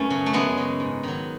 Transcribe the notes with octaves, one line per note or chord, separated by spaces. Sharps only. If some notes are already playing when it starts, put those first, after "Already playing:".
Already playing: F#2 A3 B3 C#4
C#3 F#3
A3
F#2 G#3 B3
C#3 F#3
G#2
D#3 F#3